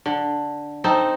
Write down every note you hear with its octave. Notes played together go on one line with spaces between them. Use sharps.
D3
C4 D#4 A4